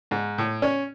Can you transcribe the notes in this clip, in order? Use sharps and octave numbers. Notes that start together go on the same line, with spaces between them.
G#2
A2
C#4